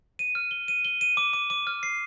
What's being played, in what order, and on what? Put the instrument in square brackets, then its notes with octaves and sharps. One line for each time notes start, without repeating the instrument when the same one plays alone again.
[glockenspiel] D#7
F6
G7
D#7
G7
D#7
D6
D6
D6
F6
C7